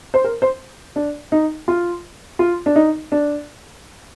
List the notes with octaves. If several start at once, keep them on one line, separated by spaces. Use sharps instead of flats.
C5
A#4
C5
D4
D#4
F4
F4
D4
D#4
D4